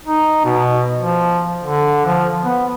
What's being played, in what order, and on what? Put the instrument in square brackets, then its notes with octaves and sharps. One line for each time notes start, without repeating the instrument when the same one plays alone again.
[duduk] D#4
B2
F3
D3
F3
B3